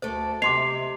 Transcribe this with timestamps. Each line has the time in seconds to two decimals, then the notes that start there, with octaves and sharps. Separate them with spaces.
0.02 D2 A3 A4 C5 D5
0.42 C3 C4 D#5 E5 C6 D6 C7 F7